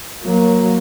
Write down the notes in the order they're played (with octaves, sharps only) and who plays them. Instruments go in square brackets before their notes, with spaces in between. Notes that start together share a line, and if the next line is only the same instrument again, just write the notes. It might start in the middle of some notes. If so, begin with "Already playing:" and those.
[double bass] F#3 A#3